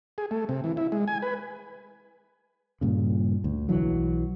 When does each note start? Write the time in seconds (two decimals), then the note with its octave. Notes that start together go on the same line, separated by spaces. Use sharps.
0.18 G#4
0.31 A3
0.49 C3
0.64 E3
0.77 E4
0.92 G#3
1.08 G#5
1.22 B4
2.81 G2 A#2 C#3
3.44 D2
3.69 B1 E3 F#3